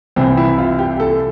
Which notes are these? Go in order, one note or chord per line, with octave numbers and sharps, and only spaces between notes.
C2 C3 E3 C4
E4
F4
G4
A4